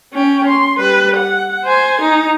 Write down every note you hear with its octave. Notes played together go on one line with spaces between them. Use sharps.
C#4 G5
C6
G3 B4
F#5
C5 G#5
D#4